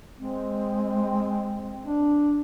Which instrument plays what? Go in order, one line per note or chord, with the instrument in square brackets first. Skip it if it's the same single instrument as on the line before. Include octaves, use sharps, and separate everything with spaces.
[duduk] G#3 [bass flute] C4
[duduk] D4